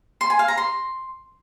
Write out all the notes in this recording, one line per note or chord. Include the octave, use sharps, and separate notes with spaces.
C6
G#5
F5
A#5
C6